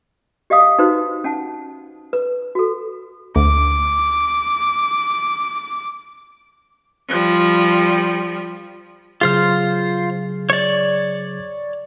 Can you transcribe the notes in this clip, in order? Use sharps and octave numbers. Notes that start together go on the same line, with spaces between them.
G4 D#5 F5 D#6
D#4 F#4 B4 C5
C#4 F#5 A5
B4
F#4 A4
D2 D6
F3 G3
C#3 F#3 F4 G#4 C5 F6
C#5 D5